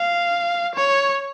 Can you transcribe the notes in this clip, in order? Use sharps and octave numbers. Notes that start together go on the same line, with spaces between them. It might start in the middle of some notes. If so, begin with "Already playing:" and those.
Already playing: F5
C#5